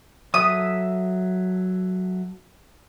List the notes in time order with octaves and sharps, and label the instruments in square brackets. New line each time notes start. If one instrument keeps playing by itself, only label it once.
[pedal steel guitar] F#3 A4 E5 [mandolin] D#6